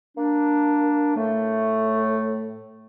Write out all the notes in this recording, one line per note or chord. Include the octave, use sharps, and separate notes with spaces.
A#3 D4
A2 A3